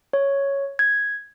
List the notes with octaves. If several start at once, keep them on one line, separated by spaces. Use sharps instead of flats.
C#5
G#6